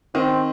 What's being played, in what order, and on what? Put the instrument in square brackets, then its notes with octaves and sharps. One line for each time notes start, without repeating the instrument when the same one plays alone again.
[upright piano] D#3 [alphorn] C4